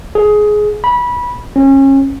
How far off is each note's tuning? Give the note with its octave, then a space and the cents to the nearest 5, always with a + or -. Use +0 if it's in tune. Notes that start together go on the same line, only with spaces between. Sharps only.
G#4 +15
B5 -20
C#4 -30